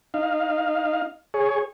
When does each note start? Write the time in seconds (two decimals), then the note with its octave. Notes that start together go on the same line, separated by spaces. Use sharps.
0.14 D#4 F5
1.34 G#4 C#5